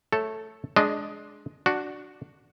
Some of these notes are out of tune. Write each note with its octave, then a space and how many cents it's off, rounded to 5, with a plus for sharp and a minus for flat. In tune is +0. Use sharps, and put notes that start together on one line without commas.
A3 +0 A4 +0 C#5 +0
G#3 +15 D4 +0 D#5 +0
D4 +5 F#4 +0